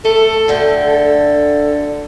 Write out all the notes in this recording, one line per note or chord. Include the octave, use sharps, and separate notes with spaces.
A3 A4
D2 D3 G5
A4